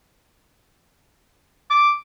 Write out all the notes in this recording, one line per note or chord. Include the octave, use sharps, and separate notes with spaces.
D6